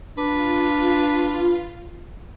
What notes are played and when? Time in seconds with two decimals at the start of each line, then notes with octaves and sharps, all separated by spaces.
0.18 D4 F4 B4